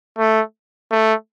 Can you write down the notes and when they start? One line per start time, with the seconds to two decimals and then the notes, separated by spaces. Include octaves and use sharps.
0.19 A3
0.92 A3